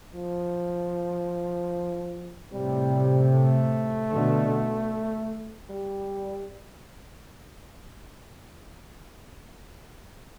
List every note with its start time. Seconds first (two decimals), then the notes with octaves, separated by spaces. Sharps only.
0.15 F3
2.52 A2 C3 G3
3.33 A3
4.12 B2 D3
5.70 G3